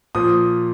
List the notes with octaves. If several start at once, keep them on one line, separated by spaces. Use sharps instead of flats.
A#2 F3 D#6